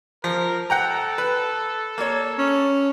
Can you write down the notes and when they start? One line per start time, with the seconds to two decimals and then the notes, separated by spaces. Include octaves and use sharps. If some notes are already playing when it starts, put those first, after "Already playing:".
0.24 F3 A#4
0.70 A4 F#5 G5 A#5
1.18 B4
1.98 A#3 C#5
2.38 C#4